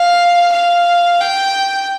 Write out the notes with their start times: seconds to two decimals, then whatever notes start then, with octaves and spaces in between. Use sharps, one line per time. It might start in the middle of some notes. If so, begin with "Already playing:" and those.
Already playing: F5
0.53 F5
1.20 G5